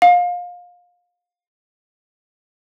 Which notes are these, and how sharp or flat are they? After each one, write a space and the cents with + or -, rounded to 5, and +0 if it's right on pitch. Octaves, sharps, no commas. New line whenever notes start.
F5 +25